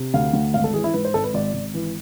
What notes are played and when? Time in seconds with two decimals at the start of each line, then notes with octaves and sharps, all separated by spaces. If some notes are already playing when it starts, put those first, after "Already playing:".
Already playing: C3
0.14 D2 F5
0.33 D2
0.54 G#1 F5
0.64 A4
0.74 E3 G#4
0.84 E4
0.94 G#2 B4
1.05 C5
1.14 G#1 A4
1.24 B4
1.34 G#1 D5
1.54 G#1
1.74 E3